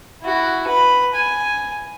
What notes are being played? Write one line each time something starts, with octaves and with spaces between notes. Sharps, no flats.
E4 F#4
B4 B5
G#5